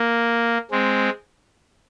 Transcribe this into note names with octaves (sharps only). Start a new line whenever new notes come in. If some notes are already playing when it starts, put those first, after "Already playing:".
Already playing: A#3
G#3 C4